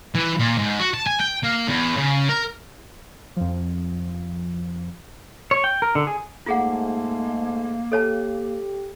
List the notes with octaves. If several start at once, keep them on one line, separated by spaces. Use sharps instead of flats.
E3
A#2
G#2
F#4
A5
G#5
G5
A#3
E2
C#3
A#4
F2 F3
C#5
G5
A#4
D3
G#4
G#2 A3 A#3 F4 G#4 F#5
G4 A4 C#5 A5